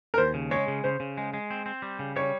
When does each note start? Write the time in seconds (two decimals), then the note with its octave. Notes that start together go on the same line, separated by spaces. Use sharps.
0.14 A#4
0.18 D#2 C5
0.34 C#3
0.51 G#3 C#5
0.68 C#3
0.84 C#3 C5
1.00 C#3
1.18 G#3
1.34 G#3
1.51 C4
1.66 C4
1.82 G3
1.99 C#3
2.16 G3 C#5